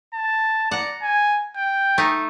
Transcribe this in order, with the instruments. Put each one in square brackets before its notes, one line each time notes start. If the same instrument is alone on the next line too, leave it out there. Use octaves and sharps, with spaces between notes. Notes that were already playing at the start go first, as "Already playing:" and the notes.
[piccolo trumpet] A5
[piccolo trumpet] D5 [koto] F#5 A#5
[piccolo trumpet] G#5
G5
[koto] A3 D#4